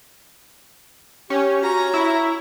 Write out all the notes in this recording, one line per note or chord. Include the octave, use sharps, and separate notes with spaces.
C#4 G4 C#5
F#4 C#5 A#5
E4